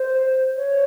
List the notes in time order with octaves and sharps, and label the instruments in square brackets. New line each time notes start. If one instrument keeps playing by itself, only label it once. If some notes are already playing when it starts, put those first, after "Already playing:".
Already playing: [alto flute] C5
C#5